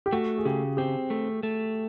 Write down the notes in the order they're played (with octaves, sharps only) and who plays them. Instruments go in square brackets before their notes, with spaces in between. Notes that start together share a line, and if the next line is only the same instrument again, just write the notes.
[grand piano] G4
[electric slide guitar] A3 [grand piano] F#4
[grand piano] G#4
[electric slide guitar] C#3 [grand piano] G4
[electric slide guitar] C4 [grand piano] G4
[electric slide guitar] A3
A3